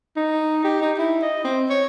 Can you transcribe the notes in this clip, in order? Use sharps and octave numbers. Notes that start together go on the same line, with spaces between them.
D#4
G4
D#4
E4
D#5
C4
C#5